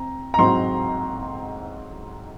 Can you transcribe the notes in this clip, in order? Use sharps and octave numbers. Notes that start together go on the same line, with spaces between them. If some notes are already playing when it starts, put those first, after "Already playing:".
Already playing: C4 A#5
A#5
G#2 F#3 C4 C6